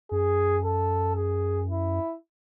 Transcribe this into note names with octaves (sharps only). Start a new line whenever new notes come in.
F#2 G#4
A4
G#4
E4